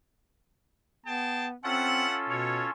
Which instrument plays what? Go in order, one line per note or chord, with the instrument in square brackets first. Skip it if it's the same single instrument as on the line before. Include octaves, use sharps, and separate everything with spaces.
[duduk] B3 [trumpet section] G#4 G5 A5
[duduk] C4 [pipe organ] C#4 F4 A4 [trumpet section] E5 F#5
[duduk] B2 [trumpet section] C#5